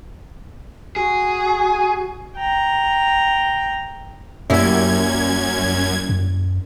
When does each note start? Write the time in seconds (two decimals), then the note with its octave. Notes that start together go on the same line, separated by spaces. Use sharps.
0.96 F#4 G#4
2.37 G5 A#5
4.50 F#2 G3 A#3 C#4 E4 G#6
6.09 F#2